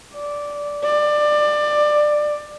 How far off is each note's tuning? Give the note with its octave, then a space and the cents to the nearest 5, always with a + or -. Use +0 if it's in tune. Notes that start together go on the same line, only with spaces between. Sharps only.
D5 -10
D5 +20